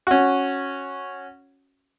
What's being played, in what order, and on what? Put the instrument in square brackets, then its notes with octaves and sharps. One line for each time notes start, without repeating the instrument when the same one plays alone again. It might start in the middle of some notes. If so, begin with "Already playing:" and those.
[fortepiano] C#4 F#4